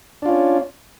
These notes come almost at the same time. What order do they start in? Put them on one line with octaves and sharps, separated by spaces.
D4 F4 C#4